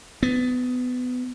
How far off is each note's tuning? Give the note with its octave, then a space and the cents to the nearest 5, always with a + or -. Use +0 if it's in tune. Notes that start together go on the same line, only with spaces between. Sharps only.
B3 +20